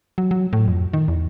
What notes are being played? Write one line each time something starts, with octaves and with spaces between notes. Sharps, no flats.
F#3
F#3
A2
F2
D#3
E2